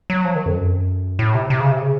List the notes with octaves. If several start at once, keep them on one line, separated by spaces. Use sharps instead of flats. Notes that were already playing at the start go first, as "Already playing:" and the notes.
F#3
F3
D#3
F2
F#2
A2
C3
C3
C#3
C3
C#3